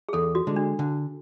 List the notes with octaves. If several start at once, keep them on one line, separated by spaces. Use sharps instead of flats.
G#4
E2 A4
F#4
D3 G#3
D4
D3